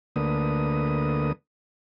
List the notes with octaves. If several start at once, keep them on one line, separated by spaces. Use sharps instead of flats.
D2 D3 A3 A#3 B4 D#6